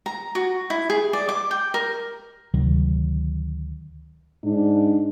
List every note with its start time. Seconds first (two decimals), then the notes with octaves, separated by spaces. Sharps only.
0.06 A#5
0.35 F#4
0.70 E4
0.90 G#4
1.13 D5
1.29 D6
1.51 G5
1.74 A#4
2.54 D2 C3 D#3 F#3
4.44 G#2 D4